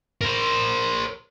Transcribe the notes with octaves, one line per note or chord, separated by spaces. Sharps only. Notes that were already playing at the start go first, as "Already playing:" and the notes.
A#4 C5